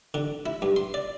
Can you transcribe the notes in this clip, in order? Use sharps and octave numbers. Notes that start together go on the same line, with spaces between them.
D3
E4
G2
C6
D5